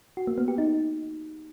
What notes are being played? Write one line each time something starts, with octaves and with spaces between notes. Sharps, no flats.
F#4
A#3
B3
G4
D#4